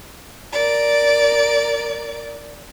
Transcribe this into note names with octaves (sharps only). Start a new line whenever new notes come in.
A#4 D5